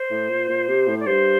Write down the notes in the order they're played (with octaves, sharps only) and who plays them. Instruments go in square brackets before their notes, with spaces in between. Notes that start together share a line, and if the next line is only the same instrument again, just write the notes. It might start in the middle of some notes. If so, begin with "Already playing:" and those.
Already playing: [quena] C5
[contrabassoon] A2
A#2
A#2
C3
A2
[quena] D5
[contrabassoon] G2 [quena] C5